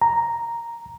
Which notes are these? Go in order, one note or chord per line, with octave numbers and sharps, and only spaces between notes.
A#5